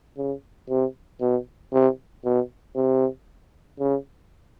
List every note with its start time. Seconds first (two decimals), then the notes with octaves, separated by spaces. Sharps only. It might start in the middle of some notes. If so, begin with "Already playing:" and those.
0.17 C#3
0.69 C3
1.21 B2
1.72 C3
2.25 B2
2.76 C3
3.80 C#3